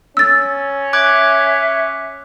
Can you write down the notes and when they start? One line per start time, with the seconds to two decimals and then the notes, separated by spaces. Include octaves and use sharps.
0.17 C#4 E6 A6
0.93 E5 D6 F#6 G#6